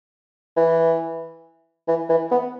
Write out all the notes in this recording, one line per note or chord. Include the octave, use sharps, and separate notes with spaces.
E3
E3
E3
B3